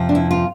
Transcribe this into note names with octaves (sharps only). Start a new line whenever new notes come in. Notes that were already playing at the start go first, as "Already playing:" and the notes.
Already playing: F2 C3 F3
D4
E4
F4